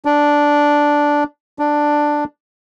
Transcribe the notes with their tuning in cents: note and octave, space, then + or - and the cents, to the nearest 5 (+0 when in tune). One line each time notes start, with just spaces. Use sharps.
D4 -5
D4 +5